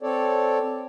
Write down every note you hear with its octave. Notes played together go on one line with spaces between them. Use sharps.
C4 A4 C#5 D5